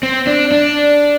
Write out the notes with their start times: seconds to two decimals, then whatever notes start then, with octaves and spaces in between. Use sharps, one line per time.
0.03 C4
0.27 D4
0.52 D4